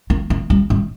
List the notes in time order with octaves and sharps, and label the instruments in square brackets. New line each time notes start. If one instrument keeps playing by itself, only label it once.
[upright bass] A#3
A#3
G3
G3